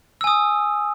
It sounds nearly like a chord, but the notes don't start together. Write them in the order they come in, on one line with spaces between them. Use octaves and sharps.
E6 G#5 D#6